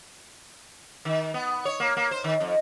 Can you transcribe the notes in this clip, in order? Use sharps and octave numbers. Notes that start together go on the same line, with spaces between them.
D#3
B3
C#5
A#3
A#3
C5
D#3
F2